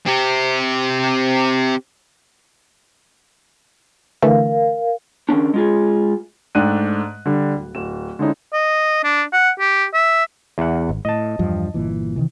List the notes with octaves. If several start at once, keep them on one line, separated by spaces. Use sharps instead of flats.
C4 G4
D3 E3 A3 A#4 F5
D#3 A#3 C#4 D4
G#3 F4 G#4
G#2 A3 D4 G5 F#6 D#7
D3 G3
D1
D1 E7
D3 G#3 C#4 D#4 E4
D#5
D4
F#5
G4
E5
E2 F#5
G#1
A2 D#5 A5
E2 G2 F3
G1 A#2 E3
C3 D#3 E3